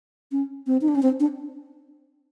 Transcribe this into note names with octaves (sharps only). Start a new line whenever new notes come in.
C#4
C4
D#4
D4
C#4
C4
D4